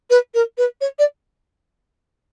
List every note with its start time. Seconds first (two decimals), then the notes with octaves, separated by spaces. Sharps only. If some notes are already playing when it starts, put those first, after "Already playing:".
0.10 B4
0.34 A#4
0.58 B4
0.81 C#5
0.99 D5